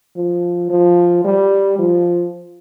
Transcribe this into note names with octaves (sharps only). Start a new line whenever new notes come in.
F3
F3
G3
F3